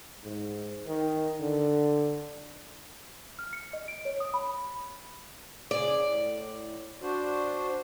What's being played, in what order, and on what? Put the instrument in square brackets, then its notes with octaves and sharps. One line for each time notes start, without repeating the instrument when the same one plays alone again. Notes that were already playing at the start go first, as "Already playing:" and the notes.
[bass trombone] G#2
D#3
D3
[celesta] F6
C#7
D#5
D7
C#5
D#6
B5
[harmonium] C#3 G#4 [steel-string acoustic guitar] D5
[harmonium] A2
D4 F#4 C5